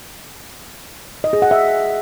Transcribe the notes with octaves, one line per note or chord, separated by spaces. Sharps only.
D#5
G#4
F#5
E5